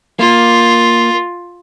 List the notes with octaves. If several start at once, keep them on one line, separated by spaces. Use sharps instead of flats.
A#3 F4